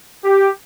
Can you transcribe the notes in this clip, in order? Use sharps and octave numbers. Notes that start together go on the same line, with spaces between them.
G4